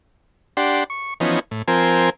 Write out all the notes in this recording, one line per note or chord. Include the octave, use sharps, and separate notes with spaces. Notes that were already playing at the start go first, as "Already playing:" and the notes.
D4 G4 F#5 C6
C#6
E3 F3 B3 C#4 D#4
A2
F3 C4 A#4 G#5